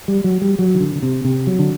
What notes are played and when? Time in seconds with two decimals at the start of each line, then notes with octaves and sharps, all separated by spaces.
0.08 G3
0.24 F#3
0.42 G3
0.59 F#3
0.75 D#3
0.80 D3
0.96 D3
1.02 C3
1.25 C3
1.47 F#3
1.59 D3